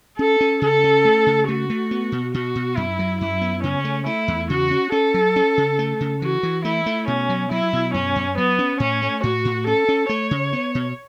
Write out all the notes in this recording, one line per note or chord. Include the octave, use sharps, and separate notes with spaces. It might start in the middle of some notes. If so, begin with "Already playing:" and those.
C#4 A4
C#4
C#3 A4
C#4
A3
C#3
A3 F#4
A3
B3
B2
B2 F#4
B2
F#2 E4
F#3
F#2 E4
B3
C#3 C#4
A3
A3 E4
E2
C#3 F#4
C#4
C#4 A4
F#3
C#4
C#3
A3
C#3
E3 F#4
E3
A3 E4
A3
B2 C#4
F#3
F#3 E4
B2
F#2 C#4
F#2
F#3 B3
C#4
A2 C#4
A3
A2 F#4
A2
C#4 A4
C#4
A3 C#5
C#3
B3
B2